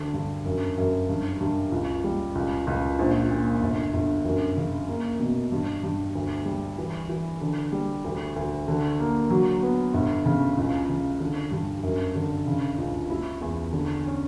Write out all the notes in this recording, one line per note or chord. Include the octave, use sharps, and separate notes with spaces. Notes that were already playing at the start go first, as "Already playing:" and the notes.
Already playing: D2 D3
G2
F#2
F#2
G2
G2
C#2
G3
C#2
C#2
A#1
A#2
G1
G1
F#2
C#3
A#3
B2
G2
G2
D2
G3
E3
E3
D3
G3
D2
D2
D3
A#3
F#3
B3
G1
C#3
C#2
C#3
D3
G2
F#2
D3
C#3
C#2
E4
E2
D3
C#4